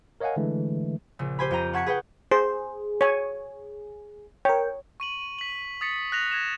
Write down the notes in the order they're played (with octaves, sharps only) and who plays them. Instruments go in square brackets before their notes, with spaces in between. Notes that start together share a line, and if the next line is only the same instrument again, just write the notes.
[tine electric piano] A#4 C#5 D#5 F5 F#5 G#5
D3 E3 G#3 A3
[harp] A#1 C#3
G4 C5 G#5 B5
F2 G5 A#5 D#7
F#5 A5 C#6 G#6 B6 C#7
G#4 B4 F#5 G5
[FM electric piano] G#4 [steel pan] C5
[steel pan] C#5 G#5
[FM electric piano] A#4 G5 [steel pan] C#5
[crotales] C#6 D#7 F#7
B6 F#7
D#6 A6 B6 C#7
F#6 A#6 F7
G#6 A#6 E7